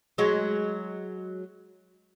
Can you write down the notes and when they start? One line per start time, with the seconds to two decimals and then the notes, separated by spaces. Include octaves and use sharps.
0.18 F#3 G#3